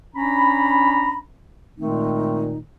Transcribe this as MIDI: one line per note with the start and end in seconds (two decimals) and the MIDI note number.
0.15 1.18 61
0.15 1.18 62
0.15 1.18 82
0.15 1.18 83
1.78 2.58 46
1.78 2.58 51
1.78 2.58 56
1.78 2.58 57
1.78 2.58 60
1.78 2.58 63